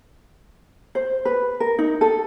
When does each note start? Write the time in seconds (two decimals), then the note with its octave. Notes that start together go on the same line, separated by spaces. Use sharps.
0.95 C5
1.25 B4
1.60 A#4
1.79 D#4
2.01 A4